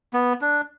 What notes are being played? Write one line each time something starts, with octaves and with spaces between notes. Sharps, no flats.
B3
D4